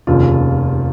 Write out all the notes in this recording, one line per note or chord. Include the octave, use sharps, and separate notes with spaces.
F1 D#2 C#3 F4